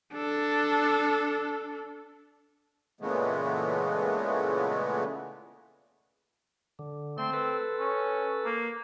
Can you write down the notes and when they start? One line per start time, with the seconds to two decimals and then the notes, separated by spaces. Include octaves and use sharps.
0.12 D4 A4
3.01 A#2 C#3 E3 G#3 A3 B3
6.79 D3
7.18 A3 C4 C6
7.33 A4 B4
7.79 C#4
8.46 A#3